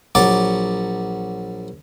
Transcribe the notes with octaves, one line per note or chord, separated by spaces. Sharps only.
A#1 F#3 D5 D6